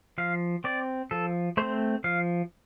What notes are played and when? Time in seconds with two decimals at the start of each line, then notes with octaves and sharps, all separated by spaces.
0.18 F3 F5
0.64 C4 D5
1.11 F3 A4
1.57 A3 C4 C5
2.04 F3 F5